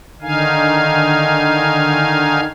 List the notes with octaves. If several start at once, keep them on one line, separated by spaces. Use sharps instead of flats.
D3 D#3 D#4 F5 G#5